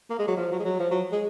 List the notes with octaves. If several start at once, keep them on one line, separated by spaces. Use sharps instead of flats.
A#3
G#3
F#3
F3
F#3
G#3
F#3
F3
F#3
G#3